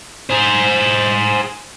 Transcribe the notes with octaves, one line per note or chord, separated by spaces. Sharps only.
G#4 C5